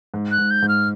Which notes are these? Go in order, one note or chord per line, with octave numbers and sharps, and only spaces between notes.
G#2
F#6
G#2
G6
G#2
F6